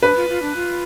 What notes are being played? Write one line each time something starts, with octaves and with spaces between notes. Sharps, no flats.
D4 B4
F4
F4
D4
F4